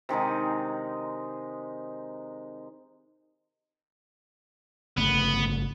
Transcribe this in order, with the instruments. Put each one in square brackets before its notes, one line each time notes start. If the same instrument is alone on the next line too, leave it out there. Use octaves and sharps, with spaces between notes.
[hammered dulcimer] C3 D#3 G#3 D#4
[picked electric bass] G1 C#3 A3 [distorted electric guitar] B3